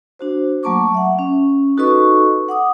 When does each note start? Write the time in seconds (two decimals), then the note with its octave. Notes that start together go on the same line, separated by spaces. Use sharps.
0.19 D4 F#4 C5
0.63 F#3 A3 A#3 A5 C#6 D6
0.94 E5 F#5
1.19 C#4
1.77 D#4 F#4 A4 B4 D#5 C#6
2.49 F#5 D6 D#6